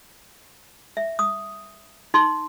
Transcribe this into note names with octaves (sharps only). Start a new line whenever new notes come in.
E5
D#6
D#4 C6